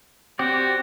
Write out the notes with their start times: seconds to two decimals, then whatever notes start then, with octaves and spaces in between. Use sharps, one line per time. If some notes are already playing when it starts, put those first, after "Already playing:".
0.39 C4 F#4 G4 D5